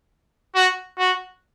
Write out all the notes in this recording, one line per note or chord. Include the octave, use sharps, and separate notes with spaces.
F#4
F#4